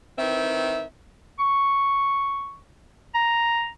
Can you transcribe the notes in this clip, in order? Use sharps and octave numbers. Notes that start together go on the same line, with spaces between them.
D#3 E3 C4 E5
C#6
A#5